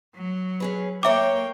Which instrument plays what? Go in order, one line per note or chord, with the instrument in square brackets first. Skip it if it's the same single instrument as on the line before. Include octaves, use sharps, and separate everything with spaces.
[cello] F#3
[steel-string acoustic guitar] C#4 G#4 B4
[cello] A#3 G5 [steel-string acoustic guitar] A4 A#4 C#5 [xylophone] E5 D6